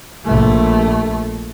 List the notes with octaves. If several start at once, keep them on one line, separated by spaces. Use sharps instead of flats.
A#1 A3